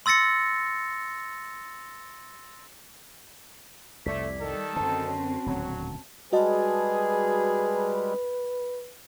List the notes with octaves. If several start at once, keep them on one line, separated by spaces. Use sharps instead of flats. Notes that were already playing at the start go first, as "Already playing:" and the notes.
C6 E6 A6 A#6 C#7
C2 F2 C3 A3 D5 B6
D#3 G3 A4
F#2 D3 C4 C#4 F#4 A5
D#1 D2 A2 F#3
G3 G#3 F#4 G#4 B4 D#5 A5